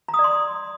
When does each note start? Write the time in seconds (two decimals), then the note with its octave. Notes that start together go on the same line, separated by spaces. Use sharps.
0.08 A#5
0.14 D#6
0.19 D5
0.24 C6